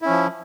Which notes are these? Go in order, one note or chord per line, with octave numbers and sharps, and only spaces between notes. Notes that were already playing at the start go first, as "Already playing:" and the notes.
F3 C#4 E4